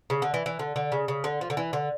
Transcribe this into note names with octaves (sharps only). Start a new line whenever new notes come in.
C#3
D3
E3
E3
D3
D3
C#3
C#3
D3
F3
D3
E3
D3